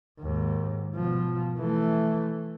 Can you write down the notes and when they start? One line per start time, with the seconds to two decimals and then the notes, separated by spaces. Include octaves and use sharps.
0.21 D#2 G#2
0.95 B2 F3
1.58 E3 A3